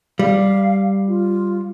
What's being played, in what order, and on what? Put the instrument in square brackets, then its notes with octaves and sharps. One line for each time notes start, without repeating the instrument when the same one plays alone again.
[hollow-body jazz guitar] G3 [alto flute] F5
[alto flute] F4